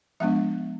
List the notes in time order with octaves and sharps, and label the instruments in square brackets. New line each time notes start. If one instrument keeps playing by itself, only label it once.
[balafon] F3 G#3 B3 D4 E5